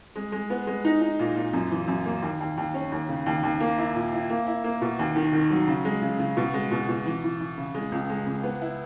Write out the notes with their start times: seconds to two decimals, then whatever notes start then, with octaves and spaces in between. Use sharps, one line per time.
0.16 G#3
0.32 G#3
0.50 B3
0.67 G#3
0.85 D#4
1.01 D#4
1.19 A#2
1.36 A#2
1.53 F#2
1.71 E3
1.88 F#2
2.06 A#3
2.22 D#2
2.40 D#2
2.57 D#2
2.74 C#4
2.92 D#2
3.09 C#3
3.26 D#2
3.43 D#2
3.60 A#3
3.78 E4
3.95 A#2
4.13 E4
4.30 A#3
4.47 E4
4.64 A#3
4.81 B2
4.99 D#2
5.16 D#3
5.33 D#3
5.50 F#3
5.68 C#3
5.85 G#3
6.02 C#3
6.20 C#3
6.37 B2
6.54 G#3
6.71 B2
6.89 B2
7.06 E3
7.24 E3
7.40 E3
7.58 C#3
7.75 G#3
7.92 C#2
8.09 G#3
8.27 C#2
8.43 B3
8.61 E4